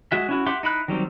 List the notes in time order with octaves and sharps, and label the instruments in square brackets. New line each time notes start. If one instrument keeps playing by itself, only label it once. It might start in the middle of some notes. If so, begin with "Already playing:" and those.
[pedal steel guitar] G#3 F#4 E5
C#4 E4 F#4
G4 E5 F#5 C6 D6
D#4 E4 B5 F#6
D#3 F#3 G3 C4